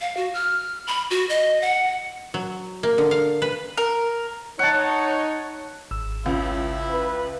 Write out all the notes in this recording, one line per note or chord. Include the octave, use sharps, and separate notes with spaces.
F5
F#4
F6
B5
F#4
D#5
F#5
F#3
A#3
D3
F5
B4
A#4
D#4 C#5 F#5 A5
G#1 E6
C#2 C#4 E4
B4